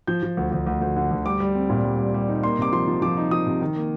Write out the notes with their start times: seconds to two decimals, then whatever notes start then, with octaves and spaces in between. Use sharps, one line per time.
0.07 F3 G6
0.23 F3
0.37 D2
0.52 D2
0.67 D2
0.82 D2
0.96 D3
1.11 D2
1.26 G3 D6
1.40 G3
1.55 C4
1.70 A#2
1.84 G3
1.99 G3
2.14 G3
2.29 D#4
2.43 A#3 C6
2.58 C3 D6
2.72 F3 C6
2.88 F3
3.02 F3 D6
3.17 D#4
3.31 F3 D#6
3.46 C3
3.61 D#3
3.76 A#3